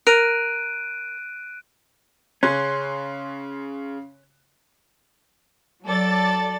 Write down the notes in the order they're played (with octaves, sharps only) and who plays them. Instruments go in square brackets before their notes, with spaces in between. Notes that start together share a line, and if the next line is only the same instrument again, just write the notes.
[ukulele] A#4 [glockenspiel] F#6 D7 D#7
[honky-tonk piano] C#3 C6 F#6 [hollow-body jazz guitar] C#4
[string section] F#3 A4 D5 A6